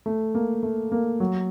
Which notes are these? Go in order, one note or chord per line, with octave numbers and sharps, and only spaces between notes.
A3
A#3
A3
A#3
F#3